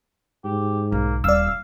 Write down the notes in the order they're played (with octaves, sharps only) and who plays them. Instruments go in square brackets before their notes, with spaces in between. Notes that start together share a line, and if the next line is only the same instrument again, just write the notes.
[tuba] G#2 [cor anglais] G4
[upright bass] B1 [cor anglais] A#3
[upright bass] D#1 [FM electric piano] D5 E6 [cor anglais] F5